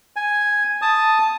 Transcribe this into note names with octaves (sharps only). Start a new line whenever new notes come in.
G#5
A5 D#6